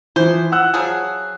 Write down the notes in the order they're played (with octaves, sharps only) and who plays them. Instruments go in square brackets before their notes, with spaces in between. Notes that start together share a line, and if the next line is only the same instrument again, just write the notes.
[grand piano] E3 F3 [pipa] C5
[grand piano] F#5 E6 F#6
[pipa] F3 F#3 G#4